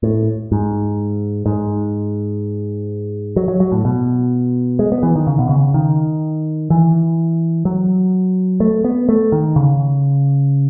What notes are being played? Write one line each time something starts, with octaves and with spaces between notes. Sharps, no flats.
A2
G#2
G#2
F#3
F#3
F#3
A2
B2
G#3
B3
E3
D#3
C#3
B2
C#3
D#3
E3
F#3
A3
B3
A3
D#3
C#3